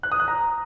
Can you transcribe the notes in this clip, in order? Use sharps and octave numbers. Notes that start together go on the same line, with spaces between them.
F#6
D#6
F#6
A#5